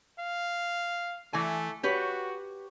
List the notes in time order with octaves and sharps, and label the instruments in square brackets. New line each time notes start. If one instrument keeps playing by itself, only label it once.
[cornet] F5
[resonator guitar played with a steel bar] E3 G#5 [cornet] A3
[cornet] F#4 [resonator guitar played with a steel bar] G4 B4 C#5